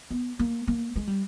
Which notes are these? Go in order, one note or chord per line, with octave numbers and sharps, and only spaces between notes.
B3
A#3
A#3
G#3
G3